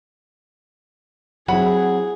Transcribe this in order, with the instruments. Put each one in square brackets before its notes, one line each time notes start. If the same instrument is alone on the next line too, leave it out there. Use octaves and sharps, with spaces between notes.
[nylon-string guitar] F#3 C4 E4 [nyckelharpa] G#4 [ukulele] F#5 B5